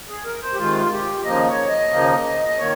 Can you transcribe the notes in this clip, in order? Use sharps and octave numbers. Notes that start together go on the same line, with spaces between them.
G#4
A#4
C5
G4
C3 D#3 G#3 F4
G4
D#2 C#3 F3 A#3 D#4 D#5
C#5
D#5
D#2 C#3 F3 A#3 D#4
D#5
D#3 A#3 C#5